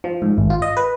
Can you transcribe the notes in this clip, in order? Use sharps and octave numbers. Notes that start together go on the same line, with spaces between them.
F3
G#2
G#1
F4
D#5
B4